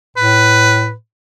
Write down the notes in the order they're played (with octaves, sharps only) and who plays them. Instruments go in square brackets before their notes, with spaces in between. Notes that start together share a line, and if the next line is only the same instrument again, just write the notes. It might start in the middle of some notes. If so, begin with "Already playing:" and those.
[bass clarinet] A2 [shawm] B4